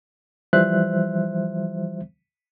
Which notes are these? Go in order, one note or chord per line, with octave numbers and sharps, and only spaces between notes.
E3 F3 G3 C5 E5 F#6